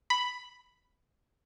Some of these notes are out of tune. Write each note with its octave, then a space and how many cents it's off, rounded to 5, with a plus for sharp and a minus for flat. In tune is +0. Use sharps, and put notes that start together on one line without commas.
B5 +5